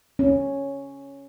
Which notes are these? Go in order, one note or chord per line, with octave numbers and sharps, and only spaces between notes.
C#4